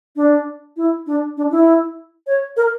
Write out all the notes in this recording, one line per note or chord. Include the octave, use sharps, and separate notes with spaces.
D4
E4
D4
D4
E4
C#5
A#4